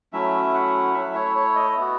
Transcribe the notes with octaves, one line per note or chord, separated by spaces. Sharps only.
F#3 A3 C#4 E4 E5
F#5
A3 E4 E5
C#5
C#5
D#5
B3 F#4